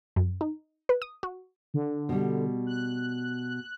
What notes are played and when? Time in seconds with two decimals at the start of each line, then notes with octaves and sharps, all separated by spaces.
0.16 F#2
0.41 D#4
0.89 B4
1.02 D#6
1.23 F#4
1.74 D3
2.09 B2 G3
2.67 F#6